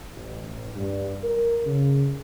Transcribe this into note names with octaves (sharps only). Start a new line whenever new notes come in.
A1
G2
A#4
C#3